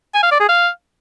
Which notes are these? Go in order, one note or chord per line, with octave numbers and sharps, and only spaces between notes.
G#5
F5
D5
G#4
F5